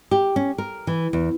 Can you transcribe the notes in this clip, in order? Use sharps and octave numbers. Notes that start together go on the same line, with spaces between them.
G4
C#4
A#4
E3
E2